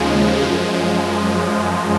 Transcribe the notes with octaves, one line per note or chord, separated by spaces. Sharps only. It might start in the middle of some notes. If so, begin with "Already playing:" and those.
Already playing: D#2 C#3 F3 G#3
F#2 F3 G#3